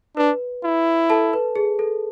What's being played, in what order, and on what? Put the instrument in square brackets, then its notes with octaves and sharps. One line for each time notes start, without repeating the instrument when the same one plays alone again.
[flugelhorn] D4 [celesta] B4
[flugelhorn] E4
[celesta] A4 A5
B4
G#4
A4